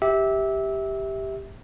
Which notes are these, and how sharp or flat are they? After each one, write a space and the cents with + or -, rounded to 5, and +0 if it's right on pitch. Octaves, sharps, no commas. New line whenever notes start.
G4 +0 E5 -20